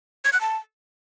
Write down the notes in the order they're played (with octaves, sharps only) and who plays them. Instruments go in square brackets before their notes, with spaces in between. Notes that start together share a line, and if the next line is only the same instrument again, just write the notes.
[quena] G#6
F#6
A5